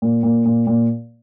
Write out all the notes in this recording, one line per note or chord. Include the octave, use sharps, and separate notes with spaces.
A#2
A#2
A#2
A#2